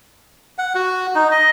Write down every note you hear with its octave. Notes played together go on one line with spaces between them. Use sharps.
F#5
F#4
D#4
D#5